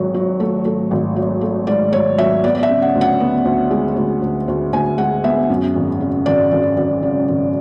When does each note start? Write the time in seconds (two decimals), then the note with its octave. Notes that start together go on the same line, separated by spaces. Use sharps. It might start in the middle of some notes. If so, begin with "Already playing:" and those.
Already playing: G#1 G#2 F#3
0.14 F#3
0.40 A3
0.65 A3
0.91 G#1
1.16 F#3
1.41 A3
1.67 G#2 D5
1.93 G#2 C#5
2.18 F#3 E5
2.44 B3 D5
2.55 D5
2.63 E5
2.69 C#3
2.82 F#5
2.95 D2
3.01 F#5
3.20 B3
3.45 D2
3.71 G#3
3.96 D2
4.22 D2
4.48 D2
4.73 D2 G#5
4.98 G#3 F#5
5.24 B3 E5
5.50 F#2
5.75 G#1
6.01 C#3
6.26 G#1 D5
6.52 G#1
6.77 G#1
7.03 C#3
7.28 G#1